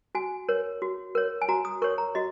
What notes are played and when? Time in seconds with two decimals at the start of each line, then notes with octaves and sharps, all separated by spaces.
0.15 F#4 G#5
0.48 A#4 C#5
0.82 F#4
1.15 A#4 C#5
1.42 G#5
1.48 F#4 A#5
1.65 D#6
1.82 A#4 C#5 C#6
1.98 A#5
2.15 F#4 D#5